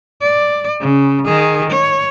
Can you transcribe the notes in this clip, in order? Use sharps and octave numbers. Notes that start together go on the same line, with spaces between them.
D5
C#3
D#3 G#4
C#5